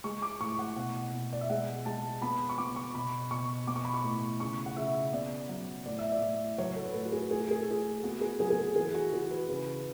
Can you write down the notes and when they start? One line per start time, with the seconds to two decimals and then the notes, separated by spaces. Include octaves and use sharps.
0.04 G#3 C#6
0.22 D6
0.40 A2 C#6
0.59 F#5
0.76 B2 F#5
1.13 B2
1.33 D5
1.41 E5
1.49 G#3 F#5
1.85 G#3 A5
2.22 B3 B5
2.49 C#6
2.58 B3 D6
2.76 C#6
2.94 B2 B5
3.31 B2 C#6
3.67 B3 D6
3.76 C#6
3.85 B5
3.94 C#6
4.04 A2
4.40 C#3 C#6
4.66 F#5
4.76 C#3 E5
5.13 B3 D5
5.49 F#3
5.85 A2 D5
5.99 E5
6.12 D5
6.22 A2
6.58 F#3 C#5
6.76 A4
6.85 B4
6.94 A2 A4
7.05 F#4
7.12 G#4
7.31 A3 G#4
7.41 A4
7.51 G#4
7.61 A4
7.67 A3 G#4
8.04 B3 F#4
8.21 G#4
8.40 F#3 G#4
8.50 G#4
8.58 A4
8.76 E3 G#4
8.94 F#4
9.12 E3 G#4
9.31 B4
9.49 C#3 B4